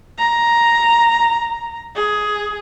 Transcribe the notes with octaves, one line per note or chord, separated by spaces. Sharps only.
A#5
G#4